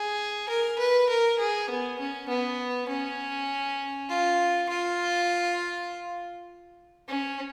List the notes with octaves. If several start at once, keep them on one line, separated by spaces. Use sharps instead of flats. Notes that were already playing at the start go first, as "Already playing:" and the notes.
Already playing: G#4
A#4
B4
A#4
G#4
B3
C#4
B3
C#4
F4
F4
C#4